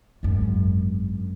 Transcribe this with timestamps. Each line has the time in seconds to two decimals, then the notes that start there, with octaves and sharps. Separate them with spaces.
0.23 G#1 F#2